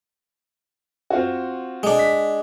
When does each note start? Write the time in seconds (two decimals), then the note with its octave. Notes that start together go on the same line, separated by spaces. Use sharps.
1.10 C4 F4 F#4
1.83 G#3 D4
1.99 B6